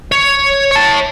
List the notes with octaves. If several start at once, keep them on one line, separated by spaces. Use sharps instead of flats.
C#5
C#5 A5